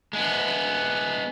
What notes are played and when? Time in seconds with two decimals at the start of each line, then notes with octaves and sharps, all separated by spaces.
0.13 G#3 B3